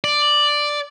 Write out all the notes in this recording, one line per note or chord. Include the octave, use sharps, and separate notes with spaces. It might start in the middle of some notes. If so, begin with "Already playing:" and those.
D5